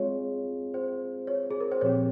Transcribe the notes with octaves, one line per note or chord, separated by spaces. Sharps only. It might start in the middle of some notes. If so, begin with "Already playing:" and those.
Already playing: G#3 C4 F4 G#4 C#5
C5
C#5
G#4
A#4
C5
A#2 F3 C4 G4 C#5